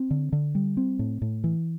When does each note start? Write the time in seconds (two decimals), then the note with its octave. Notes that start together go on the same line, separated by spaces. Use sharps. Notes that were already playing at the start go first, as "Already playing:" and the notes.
Already playing: C4
0.11 D3
0.32 D3
0.55 G3
0.77 C4
0.99 A2
1.22 A2
1.44 E3